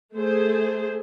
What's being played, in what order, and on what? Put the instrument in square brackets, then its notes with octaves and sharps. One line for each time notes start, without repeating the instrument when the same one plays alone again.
[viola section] A3 G#4 C5